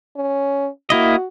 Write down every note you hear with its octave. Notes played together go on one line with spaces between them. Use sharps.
C#4
A#3 E4 F#4 D#5